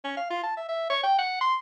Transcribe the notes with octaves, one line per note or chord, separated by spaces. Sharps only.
C#4
F5
F4
A5
E5
E5
C#5
G5
F#5
C6